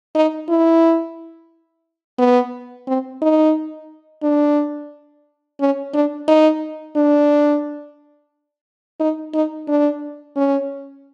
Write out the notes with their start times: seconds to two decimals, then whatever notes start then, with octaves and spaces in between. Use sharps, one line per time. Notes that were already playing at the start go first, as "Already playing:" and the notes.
0.15 D#4
0.49 E4
2.19 B3
2.87 C4
3.22 D#4
4.23 D4
5.60 C#4
5.94 D4
6.28 D#4
6.96 D4
9.00 D#4
9.34 D#4
9.68 D4
10.37 C#4